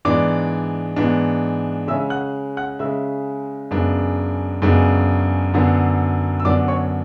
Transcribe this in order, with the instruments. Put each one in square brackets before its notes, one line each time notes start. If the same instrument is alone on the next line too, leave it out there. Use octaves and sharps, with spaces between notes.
[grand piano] G#2 E3 B3 D4 D5 D6
G#2 E3 B3 D4
C#3 G#3 C#4 E5 E6
F#5 F#6
F#5 F#6
C#3 G#3 C#4 E5 E6
F#2 C#3 G#3 B3 D4
F#2 C#3 G#3 B3 D4
F#2 D3 F#3 B3 D4
E6
F#2 D3 F#3 B3 D4 D5 D6
C#5 C#6